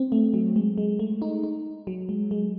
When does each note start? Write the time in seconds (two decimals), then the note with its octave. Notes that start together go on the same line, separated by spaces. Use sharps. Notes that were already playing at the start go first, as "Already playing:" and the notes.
Already playing: C4
0.12 A3
0.34 F#3
0.56 G#3
0.78 G#3
0.99 A3
1.22 D#4
1.44 D#4
1.87 F#3
2.09 G#3
2.31 G#3